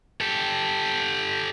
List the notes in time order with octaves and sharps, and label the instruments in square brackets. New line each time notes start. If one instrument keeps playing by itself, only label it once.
[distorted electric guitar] G4 A4